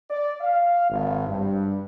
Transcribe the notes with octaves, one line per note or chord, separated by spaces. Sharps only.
D5
F5
G#1
G2